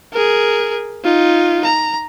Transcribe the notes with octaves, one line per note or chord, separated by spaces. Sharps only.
G#4 A#4
D#4 F4
A#5